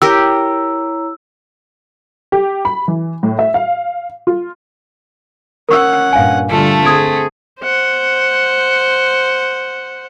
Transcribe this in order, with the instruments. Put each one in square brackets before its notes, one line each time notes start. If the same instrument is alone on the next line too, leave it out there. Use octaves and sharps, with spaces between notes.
[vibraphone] E4 C#5 A#5 [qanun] G4 A#4 [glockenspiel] E6
[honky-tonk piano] G4
B5
E3
A2
E5
F5
F4
[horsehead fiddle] C#4 F#5 [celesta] A#4 C#6 E6
[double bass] G2 A#2 [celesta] F5 G#5
[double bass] D3 G3 [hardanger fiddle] A3 [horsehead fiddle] F4 A4
[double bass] C4 [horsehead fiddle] G#4 [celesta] D#6 G#6 D7
[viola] C5 F#5